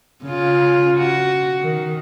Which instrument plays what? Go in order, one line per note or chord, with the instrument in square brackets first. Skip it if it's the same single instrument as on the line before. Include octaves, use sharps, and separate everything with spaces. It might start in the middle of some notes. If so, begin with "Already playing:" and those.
[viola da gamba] C#3 F4
F#4
D#3